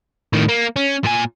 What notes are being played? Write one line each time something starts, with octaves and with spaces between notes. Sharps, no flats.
A2 D#3
A#3
C#4
A#2 G#5